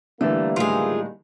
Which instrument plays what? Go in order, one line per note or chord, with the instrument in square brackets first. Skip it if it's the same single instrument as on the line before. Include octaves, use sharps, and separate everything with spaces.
[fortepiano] D3 E3 [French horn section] G3 A#3 [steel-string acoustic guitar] A3
[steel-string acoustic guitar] A2 D#3 G#3 [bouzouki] F4 G#4